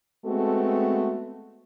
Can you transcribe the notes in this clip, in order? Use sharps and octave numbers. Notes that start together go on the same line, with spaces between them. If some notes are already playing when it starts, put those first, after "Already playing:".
G#3 A3 B3 C4 F#4 A4